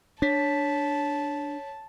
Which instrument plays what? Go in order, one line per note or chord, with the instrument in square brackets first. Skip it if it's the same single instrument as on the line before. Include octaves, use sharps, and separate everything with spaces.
[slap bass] D4 [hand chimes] C#5 B6 [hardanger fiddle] A5